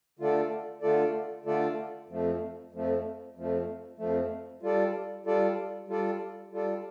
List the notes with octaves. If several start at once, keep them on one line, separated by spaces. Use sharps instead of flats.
D3 A3 F4 A4 D5
D3 A3 F4 A4 D5
D3 A3 F4 A4 D5
F2 F3 A3
F2 F3 A3
F2 F3 A3
F2 F3 A3
G3 F4 A4 D5
G3 F4 A4 D5
G3 F4 A4 D5
G3 F4 A4 D5